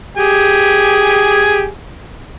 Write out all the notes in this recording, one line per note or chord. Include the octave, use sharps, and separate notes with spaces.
G4 G#4 G#5